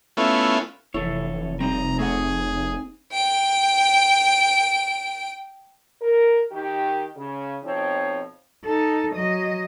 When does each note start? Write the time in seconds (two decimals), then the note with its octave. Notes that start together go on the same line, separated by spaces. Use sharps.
0.17 A3 B3 C#4 E4 F4
0.94 F1 E3 E4 A4 C#5
1.60 G3 C4 D#4 A#5
1.99 A3 G#4 F#5
3.12 G5 D7
6.02 A#4
6.52 D#3 G4
7.16 C#3
7.63 F2 B2 F3 C4 D#4 C#5
8.65 D#4 A4
9.15 F#3 D#5